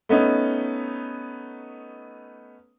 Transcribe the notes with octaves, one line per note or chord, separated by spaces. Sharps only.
A3 B3 C#4 D#4